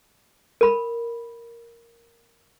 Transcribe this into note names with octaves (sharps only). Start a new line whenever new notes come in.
A#4 B5